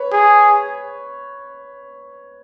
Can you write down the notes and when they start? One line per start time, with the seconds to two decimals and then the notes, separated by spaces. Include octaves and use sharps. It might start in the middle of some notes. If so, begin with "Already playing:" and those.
Already playing: B4 C#5
0.12 G#4